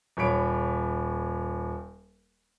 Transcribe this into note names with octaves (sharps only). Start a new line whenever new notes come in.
D#1 C#5 B5 D7